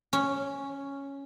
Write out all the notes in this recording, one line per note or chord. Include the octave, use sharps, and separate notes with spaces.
C#4